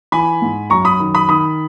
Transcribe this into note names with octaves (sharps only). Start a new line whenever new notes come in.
E3 G#5 B5
G#2
F#2 A#5 C#6
B5 D#6
D#3
B5 D#6
D#3 B5 D#6